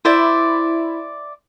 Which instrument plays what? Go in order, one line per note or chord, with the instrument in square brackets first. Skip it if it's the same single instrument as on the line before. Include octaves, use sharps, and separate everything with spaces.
[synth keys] E4 [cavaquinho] C5 D5 E5